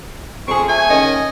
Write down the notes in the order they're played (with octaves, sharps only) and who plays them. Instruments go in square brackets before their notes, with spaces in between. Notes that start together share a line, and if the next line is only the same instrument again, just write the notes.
[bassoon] F2 [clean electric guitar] C4 G#4 [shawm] C#6
[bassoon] A3 [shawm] G#5
[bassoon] D#3 [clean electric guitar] C#4 [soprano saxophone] D#5